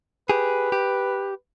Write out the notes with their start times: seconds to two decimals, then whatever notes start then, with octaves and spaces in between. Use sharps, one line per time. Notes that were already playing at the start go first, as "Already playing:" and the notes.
0.30 G4 G#4 B4
0.72 G4